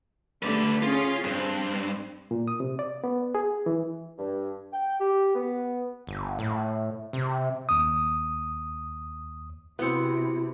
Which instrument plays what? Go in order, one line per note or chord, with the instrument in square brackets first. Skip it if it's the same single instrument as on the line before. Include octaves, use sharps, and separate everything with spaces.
[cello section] D3 G3 A3 [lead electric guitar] B4 D5
[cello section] C#4 G#4 [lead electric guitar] F4
[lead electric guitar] G2 [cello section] C4
[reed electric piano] A#2
D#6
C3
D5
B3
G#4
E3
[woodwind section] G2
G5
G4
B3
[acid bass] G1
A2
C3
[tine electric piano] D#2 D#6
[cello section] C3 [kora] B3 C4 [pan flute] E4 [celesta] F#4 C#7